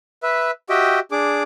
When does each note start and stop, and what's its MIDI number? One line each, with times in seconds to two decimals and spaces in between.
0.23 0.51 71
0.23 0.51 76
0.70 1.00 66
0.70 1.00 67
0.70 1.00 75
0.70 1.00 76
0.70 1.00 79
1.12 1.43 62
1.12 1.43 68
1.12 1.43 86